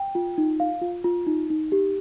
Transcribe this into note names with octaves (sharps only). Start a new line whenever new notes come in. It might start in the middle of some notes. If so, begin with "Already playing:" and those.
Already playing: G5
F4
D#4
F5
F4
F4
D#4
D#4
G4